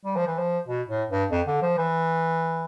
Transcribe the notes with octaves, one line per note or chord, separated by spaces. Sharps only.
G3
F3
E3
F3
B2
A2
G2
F2
D3
F3
E3